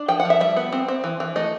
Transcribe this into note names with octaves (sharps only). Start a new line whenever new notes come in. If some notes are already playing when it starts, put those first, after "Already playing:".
Already playing: D4
F3 G5
F#5
F3 E5
G3 E5
B3
C4
C4
E3
E3
A3 D#5